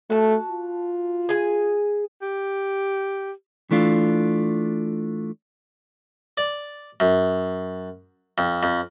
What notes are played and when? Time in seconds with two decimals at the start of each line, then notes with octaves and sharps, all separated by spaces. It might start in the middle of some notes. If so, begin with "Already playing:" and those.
0.10 A3 F#4 A5
0.51 F4
1.29 G#4 G#5
2.22 G4
3.71 E3 A3 D4 F4
6.38 D5
7.00 F#2
8.38 F2
8.63 F2